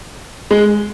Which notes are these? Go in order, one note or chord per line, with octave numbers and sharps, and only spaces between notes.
G#3